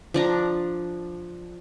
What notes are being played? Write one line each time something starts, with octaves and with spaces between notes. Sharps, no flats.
F3 D4 A#5